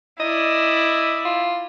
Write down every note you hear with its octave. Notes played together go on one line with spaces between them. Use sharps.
E4 D5 D#5
F4